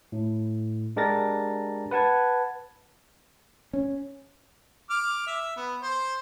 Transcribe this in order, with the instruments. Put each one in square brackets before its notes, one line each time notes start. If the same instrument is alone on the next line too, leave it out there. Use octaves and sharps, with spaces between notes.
[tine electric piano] A2
G#3 D4 G4 A#4 A6 A#6
B4 F#5 A5 G#6
[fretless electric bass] C#4
[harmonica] D6 F6
E5
B3
C5